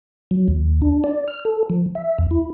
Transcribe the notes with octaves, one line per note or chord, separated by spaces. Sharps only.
F#3
D#2
D4
D5
F6
A4
F3
E5
E2
E4